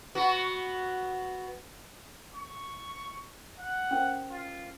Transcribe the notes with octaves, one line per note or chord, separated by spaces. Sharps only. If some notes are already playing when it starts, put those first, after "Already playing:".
B3 F#4
C#6
F#5
C#4 A#4 C5
F4